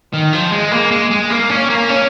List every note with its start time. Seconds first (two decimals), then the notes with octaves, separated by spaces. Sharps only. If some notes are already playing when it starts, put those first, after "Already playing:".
0.13 D#3
0.33 F3
0.52 G#3
0.72 A#3
0.91 G#3
1.11 G#3
1.30 A#3
1.50 C#4
1.70 A#3
1.89 C#4